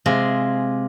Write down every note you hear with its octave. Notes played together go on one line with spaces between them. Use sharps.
C3 G#3 F4 G#4